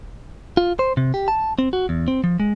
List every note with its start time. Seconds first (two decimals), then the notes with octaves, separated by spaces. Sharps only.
0.57 F4
0.79 C5
0.97 C3
1.14 G4
1.28 A5
1.59 C4
1.73 F#4
1.89 E2
2.08 C4
2.24 F3
2.40 G#3